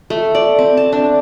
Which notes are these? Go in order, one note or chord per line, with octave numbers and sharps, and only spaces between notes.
A3
D5
C4
A5
D4